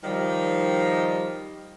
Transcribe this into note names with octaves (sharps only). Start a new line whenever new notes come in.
D#3 F3 G3